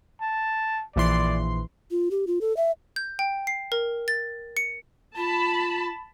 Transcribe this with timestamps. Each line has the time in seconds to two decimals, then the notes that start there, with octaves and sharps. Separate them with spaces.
0.21 A5
0.96 A#1 E3 D5 C6
1.91 F4
2.11 G4
2.27 F4
2.41 A4
2.57 E5
2.96 G6
3.19 G5
3.47 C7
3.72 A#4
4.08 A6
4.57 C#7
5.16 F4 A5 B5